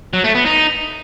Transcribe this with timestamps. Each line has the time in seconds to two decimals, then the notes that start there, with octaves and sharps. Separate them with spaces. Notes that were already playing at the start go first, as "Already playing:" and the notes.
0.13 F#3
0.24 A3
0.35 B3
0.45 D#4